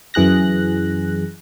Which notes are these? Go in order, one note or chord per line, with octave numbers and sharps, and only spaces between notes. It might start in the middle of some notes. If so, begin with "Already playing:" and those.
F#2 E3 G#4 F#6 A#6